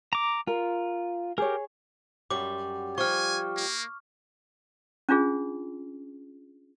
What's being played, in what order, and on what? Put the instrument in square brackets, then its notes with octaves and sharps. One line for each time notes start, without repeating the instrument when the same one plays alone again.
[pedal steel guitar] A#5 D6
[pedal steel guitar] F4 [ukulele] A#4
[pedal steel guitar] G4 A#4 [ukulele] G#4 C#5
[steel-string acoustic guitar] F#2 G3 [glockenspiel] D6
[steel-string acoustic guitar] F3 G3 [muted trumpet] G#5 [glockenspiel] C#6 F6
[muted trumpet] A#3
[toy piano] C#4 D4 F4 G#4